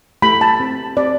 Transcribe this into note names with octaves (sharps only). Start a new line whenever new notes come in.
A3 E4 G4 B5
A5
C4 G4
C4 G4 D5